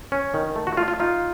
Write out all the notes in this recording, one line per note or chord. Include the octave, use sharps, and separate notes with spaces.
C#4
D#3
A3
F#4
A3 F4
F4
D#4 F4